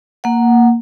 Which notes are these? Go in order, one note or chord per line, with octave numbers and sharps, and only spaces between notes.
A#3 F#5